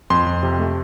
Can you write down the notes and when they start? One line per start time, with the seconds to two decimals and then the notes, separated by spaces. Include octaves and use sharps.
0.10 F2 C6
0.26 F2
0.43 C3
0.60 A3